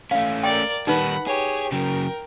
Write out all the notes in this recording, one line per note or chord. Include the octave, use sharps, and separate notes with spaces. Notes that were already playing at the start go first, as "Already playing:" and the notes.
A3 C#4 F5
A#4 D5 G5
D#3 G3 D#4 B4 F#5 B5
G4 G#4 C#5
C#3 F#3 A#4 G5